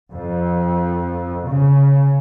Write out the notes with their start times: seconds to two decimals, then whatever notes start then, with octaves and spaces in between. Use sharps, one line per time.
0.11 F2
1.46 C#3